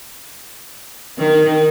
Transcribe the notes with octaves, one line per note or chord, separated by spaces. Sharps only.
D#3